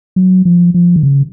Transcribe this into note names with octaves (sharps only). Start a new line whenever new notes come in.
F#3
F3
F3
D#3
C#3